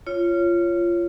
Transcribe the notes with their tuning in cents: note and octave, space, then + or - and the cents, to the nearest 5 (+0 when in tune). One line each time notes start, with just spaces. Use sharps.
F4 -20 C#5 +0